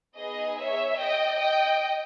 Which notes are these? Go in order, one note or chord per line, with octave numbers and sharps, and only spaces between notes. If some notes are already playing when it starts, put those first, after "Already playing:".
B3 D#4 G#4 D#5
C#5 E5
D#5 G5
D#5 G5